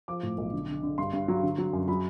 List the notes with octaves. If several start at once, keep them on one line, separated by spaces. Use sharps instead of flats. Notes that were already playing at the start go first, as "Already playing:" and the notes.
F3 D6
A2
B1
D3
D3
D3
G2 C6
G2
F#3
D3
F#3
F#2
F#3 B5